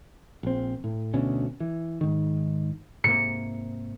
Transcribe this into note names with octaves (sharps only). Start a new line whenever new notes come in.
A#1 C4
A2
D2 B2 C#4
E3
G#2 D#3
G#2 C3 A#3 C#7